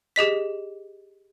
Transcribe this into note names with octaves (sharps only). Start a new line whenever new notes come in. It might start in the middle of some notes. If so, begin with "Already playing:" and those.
G4 G#4 D#5 B6